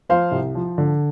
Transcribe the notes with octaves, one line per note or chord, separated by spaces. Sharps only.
F3 C5 F5
C2
F3
D3